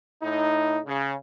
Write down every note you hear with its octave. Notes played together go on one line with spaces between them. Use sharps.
A2 D#4
C#3